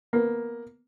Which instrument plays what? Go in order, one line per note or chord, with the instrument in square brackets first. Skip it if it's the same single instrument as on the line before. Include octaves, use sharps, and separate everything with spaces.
[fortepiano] A#3 B3